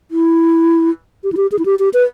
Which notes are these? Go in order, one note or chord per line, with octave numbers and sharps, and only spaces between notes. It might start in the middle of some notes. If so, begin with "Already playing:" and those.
E4
G4
E4
G4
G#4
E4
G4
G4
B4